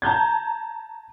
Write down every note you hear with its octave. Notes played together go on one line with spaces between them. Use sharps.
A5 A#5 G6 G#6